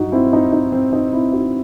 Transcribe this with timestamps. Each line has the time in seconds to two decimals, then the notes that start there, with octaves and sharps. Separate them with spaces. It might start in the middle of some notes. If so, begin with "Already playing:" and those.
Already playing: G2 F#3 D#4 F#4
0.12 C4 E4
0.33 D#4
0.53 D#4
0.72 C4
0.93 D#4
1.13 C4 E4
1.33 D#4 F#4